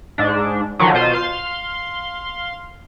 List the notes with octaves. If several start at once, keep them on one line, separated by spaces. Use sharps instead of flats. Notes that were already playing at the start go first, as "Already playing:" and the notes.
G#2 D4
D3 D#3 F3 F#3
B2 F4 C5 D#7
F5 C6